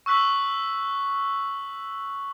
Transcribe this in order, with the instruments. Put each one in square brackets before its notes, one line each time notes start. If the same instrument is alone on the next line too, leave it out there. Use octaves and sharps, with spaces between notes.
[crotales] C#6 E6 F#6 B6 F#7